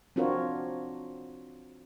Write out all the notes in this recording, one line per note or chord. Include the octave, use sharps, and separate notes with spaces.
C4 D4 F4 F#4 A#4 C#5